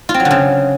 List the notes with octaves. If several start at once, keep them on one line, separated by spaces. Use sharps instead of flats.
F4
C4
F#3
D3
C#3